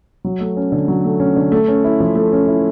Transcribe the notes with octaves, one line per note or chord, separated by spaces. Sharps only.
F#3
A3
C#4
D3
F#3
A3
C#4
D3
A3
C#4
E4
F3
A3
C#4
E4